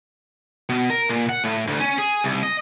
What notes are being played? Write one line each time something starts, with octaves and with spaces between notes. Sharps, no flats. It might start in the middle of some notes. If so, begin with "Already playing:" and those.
B2
A#4
A#2
F#5
A2
D2
C#4
G#4
C2
D#5